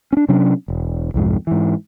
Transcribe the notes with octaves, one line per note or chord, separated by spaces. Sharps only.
C#4 D4
C3 F#3 C#4 D4
E1
C2 F2 G#2
G#2 E3